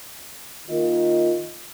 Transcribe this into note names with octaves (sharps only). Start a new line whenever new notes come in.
D#3 A#3 F4 A#4 D#5